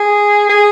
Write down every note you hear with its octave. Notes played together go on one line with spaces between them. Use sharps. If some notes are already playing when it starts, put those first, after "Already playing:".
Already playing: G#4
G#4